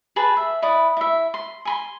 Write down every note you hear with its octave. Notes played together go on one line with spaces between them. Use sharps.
G#4 B4 A5 B5
E5
E4 B4 D5 D#6
E4 E5
C6
G#5 B5 C6